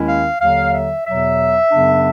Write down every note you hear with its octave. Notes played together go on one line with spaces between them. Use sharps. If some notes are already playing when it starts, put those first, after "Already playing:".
Already playing: D#2 D#3 G#3 C#4 E4
F5
D#2 D3 F#3 F5
E5
E2 B2 F#3 E5
F#2 C#3 F#3 B3 D4